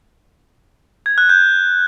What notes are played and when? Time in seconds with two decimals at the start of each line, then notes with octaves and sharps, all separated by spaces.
1.06 G#6
1.18 F#6
1.29 G6